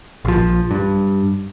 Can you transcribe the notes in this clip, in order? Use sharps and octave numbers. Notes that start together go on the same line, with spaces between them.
A#1 F3
G2